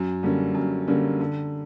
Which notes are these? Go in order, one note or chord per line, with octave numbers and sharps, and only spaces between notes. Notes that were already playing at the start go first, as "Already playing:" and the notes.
Already playing: F#2
D3 G3 A#3 C#4
F#2
D3 G3 A#3 C#4
D3